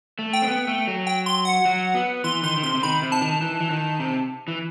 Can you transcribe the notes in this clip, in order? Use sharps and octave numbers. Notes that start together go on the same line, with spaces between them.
A3
G5
C4
B3
A3
F#3
G5
C6
F#5
F#3
B3
E3 C6
D#3 C6
D#3
C3 C6
C3
D#3 B5
C3
A5
D#3
E3
E3
D#3
C3
E3